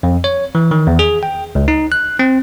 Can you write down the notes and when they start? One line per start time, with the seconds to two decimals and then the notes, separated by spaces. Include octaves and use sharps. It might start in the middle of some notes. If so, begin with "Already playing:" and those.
0.03 F2
0.24 C#5
0.55 E3
0.71 D#3
0.87 E2
0.99 G#4
1.23 G5
1.55 C#2
1.68 D#4
1.92 F#6
2.19 C4